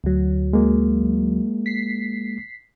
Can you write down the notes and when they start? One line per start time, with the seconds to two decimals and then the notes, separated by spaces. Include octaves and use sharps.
0.04 D2 F#3
0.53 G#3 A#3
1.66 B6 C7